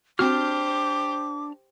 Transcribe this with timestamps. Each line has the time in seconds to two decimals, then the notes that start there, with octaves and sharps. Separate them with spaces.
0.19 C4 D4 F#4 G4 C5 D6 F6